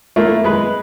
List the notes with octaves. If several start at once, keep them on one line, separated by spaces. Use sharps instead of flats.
A3 A#3 E4
G#3 B4